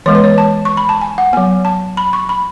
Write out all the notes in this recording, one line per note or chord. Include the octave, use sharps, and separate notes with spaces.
E3 G#3 B3 C#5
B4
C#5
A5
C#6
B5
A5
G#5
F#5
F#3 B3 G#5
A5
B5
C#6
B5